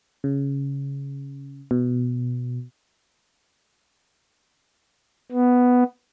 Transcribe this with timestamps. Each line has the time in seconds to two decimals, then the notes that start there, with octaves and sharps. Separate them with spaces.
0.24 C#3
1.71 B2
5.32 B3